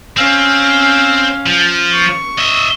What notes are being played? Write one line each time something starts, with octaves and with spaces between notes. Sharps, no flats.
C4 C#4 F5
F3
C#6
D#5 E5